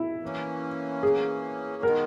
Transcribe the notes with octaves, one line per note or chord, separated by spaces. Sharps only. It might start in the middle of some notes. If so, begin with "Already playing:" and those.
Already playing: E4
E3 A#3 C#4
G#4
D#3 G#3 B3 A#4